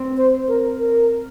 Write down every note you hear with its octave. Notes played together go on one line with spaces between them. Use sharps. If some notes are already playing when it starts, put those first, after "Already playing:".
Already playing: C4
C5
A#4
A#4